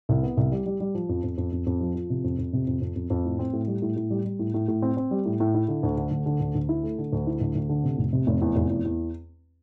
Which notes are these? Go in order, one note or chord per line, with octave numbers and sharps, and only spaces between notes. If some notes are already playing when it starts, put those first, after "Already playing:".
C2
B3
C2
G3
G3
G3
F3
F2
F2
F2
F2
F2
F3
F3
C3
F2
F2
C3
F2
F2
F2
F2
A2
C4
A2
G3
A2
A2
G3
G3
A2
A2
A2
C4
C4
G3
A2
A2
E4
D3
D2
D3
D2
D3
D2
D2
E4
A3
D3
D2
E4
D2
D2
D3
C3
F1
C3
F1
E2
F1
E2
E2